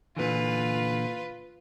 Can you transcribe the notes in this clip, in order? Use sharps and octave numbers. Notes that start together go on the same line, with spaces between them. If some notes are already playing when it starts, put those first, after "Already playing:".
A#2 D3 E3 F4 B4